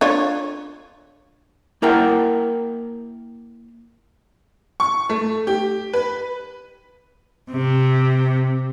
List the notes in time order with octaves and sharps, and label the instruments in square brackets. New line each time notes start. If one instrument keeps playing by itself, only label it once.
[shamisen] D4 F4 C#5
[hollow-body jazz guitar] A#3 E4 A#4 F#5 G5
[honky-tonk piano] C#6
A3
G4
B4
[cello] C3